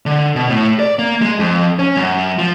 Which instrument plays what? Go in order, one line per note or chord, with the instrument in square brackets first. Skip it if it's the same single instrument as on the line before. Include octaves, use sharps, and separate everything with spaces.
[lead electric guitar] D3
B2
A2
D5
A#3
G#3
F2
C#4
F#2
F3